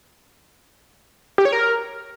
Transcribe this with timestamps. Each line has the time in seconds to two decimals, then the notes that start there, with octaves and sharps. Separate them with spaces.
1.38 G4
1.45 C#5
1.52 A#4